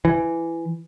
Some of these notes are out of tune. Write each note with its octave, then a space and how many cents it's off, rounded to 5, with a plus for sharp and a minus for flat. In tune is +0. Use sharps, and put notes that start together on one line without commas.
E3 +15